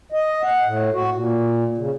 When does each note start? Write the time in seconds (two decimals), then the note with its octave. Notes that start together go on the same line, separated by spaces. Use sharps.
0.12 D#5
0.43 F#5
0.64 A2
0.93 F#4
1.14 A#2
1.78 C#3